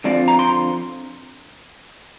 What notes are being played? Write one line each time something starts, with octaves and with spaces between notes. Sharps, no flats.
D3 F3 C4 F4 D5
A#5
C6